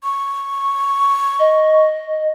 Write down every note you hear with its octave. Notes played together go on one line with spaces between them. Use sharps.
C#6
D#5